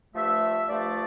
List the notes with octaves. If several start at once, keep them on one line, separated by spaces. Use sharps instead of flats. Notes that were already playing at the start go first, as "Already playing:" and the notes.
G2 F3 A3 E5
G2 F3 A3 D5